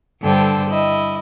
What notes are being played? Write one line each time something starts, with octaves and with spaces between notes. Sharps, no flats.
G2 D3 A4 C5 G5
E4 D#5